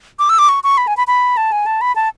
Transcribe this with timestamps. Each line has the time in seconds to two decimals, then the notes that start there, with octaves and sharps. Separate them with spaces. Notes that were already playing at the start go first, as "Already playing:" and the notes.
0.19 D6
0.29 E6
0.39 D6
0.49 C#6
0.64 C#6
0.78 B5
0.87 G#5
0.97 B5
1.07 B5
1.37 A5
1.52 G#5
1.66 A5
1.81 B5
1.96 A5